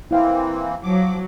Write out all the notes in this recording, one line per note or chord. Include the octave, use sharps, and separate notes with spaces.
E3 A#3 C4 E4 F5 G5
F3 F#3 D6